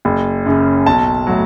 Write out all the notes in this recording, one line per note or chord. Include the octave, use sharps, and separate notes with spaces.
F#1
F#2 C#3
B1 A5
A2 F#3